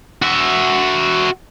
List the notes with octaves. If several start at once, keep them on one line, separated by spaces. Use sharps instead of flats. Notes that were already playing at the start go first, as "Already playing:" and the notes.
F#4 E5